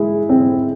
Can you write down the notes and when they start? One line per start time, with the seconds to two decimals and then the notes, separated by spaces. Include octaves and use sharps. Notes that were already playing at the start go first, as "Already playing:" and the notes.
Already playing: G#3 E4
0.29 C4